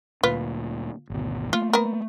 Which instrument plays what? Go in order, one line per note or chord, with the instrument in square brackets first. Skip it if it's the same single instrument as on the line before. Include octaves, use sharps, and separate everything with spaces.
[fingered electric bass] D2 A#2 [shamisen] F4 B4
[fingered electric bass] G#1 D2 B2
[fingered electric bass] A3 A#3 [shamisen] F4
[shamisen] B3 A#4